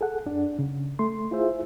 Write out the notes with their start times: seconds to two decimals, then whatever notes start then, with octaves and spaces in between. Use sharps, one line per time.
0.01 G#4 A4 F#5
0.26 F#2 D4
0.59 C#3
0.99 A3 C6
1.31 E4 F4 G#4 C5 E5